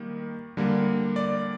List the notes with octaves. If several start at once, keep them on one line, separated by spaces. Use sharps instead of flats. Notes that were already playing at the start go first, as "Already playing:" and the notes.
Already playing: D#3 G3 A#3
D3 G3 A#3
D5